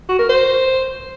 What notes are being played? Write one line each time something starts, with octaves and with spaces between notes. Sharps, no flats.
F#4
A#4
C5